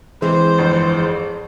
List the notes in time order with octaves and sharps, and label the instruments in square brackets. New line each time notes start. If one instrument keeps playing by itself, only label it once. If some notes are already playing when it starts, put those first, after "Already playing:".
[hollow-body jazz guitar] E3 G#3 C4 [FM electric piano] G#4 [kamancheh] C5
[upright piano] G1 F2